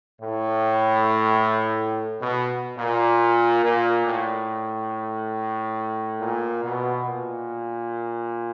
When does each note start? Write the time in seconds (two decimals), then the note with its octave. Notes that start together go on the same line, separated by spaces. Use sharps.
0.22 A2
2.21 B2
2.78 A#2
3.64 A#2
4.06 A2
6.21 A#2
6.63 B2
7.06 A#2